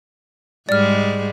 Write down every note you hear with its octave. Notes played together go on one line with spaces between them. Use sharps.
G#2 G3 G#3 D5 F6